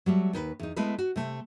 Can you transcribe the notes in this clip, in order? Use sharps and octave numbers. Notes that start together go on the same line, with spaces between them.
F#3 G3 A3
D#2 D#4 B4
E2 D#4
G#3 A3 B3 E4 B4
F#4
C3 A3